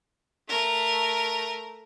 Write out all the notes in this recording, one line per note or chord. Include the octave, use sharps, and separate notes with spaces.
A3 A#4